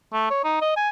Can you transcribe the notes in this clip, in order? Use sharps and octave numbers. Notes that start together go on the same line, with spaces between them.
A3
C#5
D#4
D#5
G#5